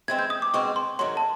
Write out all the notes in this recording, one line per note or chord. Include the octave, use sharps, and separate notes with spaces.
E3 G#3 C4 G#6
G6
D#6
D6
B2 G#3 C4 C#6
C6
G#2 D#3 F#3 A3 C6
A5